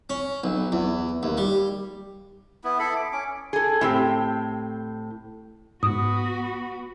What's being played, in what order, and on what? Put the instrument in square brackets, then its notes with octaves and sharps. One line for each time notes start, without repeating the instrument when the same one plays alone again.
[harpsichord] C#4
B1
E2
D#2
G3
[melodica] B3 E4
E4 A4 B5
D6
C#4 D6
[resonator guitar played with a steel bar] G#4 A4
A2 C4 G4
[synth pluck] G#2 [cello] B3 F#4 [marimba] D#6